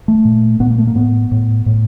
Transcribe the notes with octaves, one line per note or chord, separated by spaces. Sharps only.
A3
A#2
A#2 B3
A#3
A3
A#3
A2 B3
A2
A2